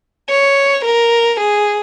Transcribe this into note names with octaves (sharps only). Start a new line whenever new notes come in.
C#5
A#4
G#4